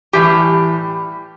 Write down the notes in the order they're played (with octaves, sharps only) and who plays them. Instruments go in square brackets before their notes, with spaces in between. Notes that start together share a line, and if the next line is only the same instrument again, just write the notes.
[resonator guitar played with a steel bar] A2 E3 G3 G4